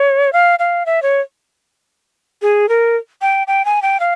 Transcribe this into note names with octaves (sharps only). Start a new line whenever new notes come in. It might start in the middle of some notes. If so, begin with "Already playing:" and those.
Already playing: C#5
F5
F5
E5
C#5
G#4
A#4
G5
G5
G#5
G5
F5